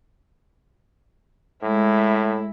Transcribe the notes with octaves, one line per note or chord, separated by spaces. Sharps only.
A2 G#3 E4